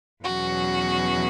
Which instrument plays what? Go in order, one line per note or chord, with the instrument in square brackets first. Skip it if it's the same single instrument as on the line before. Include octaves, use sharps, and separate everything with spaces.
[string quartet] E2 B2 F#3 C#4 F#4